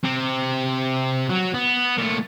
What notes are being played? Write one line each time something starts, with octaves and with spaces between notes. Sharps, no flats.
C3 C4
F#3
B3
A#2 A3